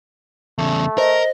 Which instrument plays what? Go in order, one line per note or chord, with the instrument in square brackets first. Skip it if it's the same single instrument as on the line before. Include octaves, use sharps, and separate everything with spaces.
[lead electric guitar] E2 C#3 [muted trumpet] A3
[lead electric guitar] A#4 [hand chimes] C5 [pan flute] D#5